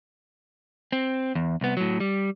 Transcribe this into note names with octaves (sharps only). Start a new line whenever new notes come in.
C4
E2
C2 B3
A2 F#3
G3